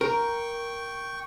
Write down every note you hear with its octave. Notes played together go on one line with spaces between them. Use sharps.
A#4 G5 C#6